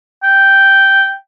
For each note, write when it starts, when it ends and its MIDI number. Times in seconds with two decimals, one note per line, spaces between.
0.24 1.12 79